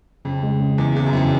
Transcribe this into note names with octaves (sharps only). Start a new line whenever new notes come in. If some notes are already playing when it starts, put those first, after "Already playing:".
F2 C#3
G#3
C#3
E2 E3
E2 C#3
F#2
F2 E3